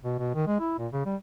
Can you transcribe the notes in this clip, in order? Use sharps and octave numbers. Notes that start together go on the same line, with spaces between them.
B2
B2
D#3
G#3
E4
A#2
C#3
G3